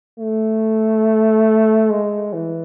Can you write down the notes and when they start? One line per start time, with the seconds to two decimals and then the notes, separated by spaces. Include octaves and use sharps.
0.19 A3
1.90 G#3
2.33 E3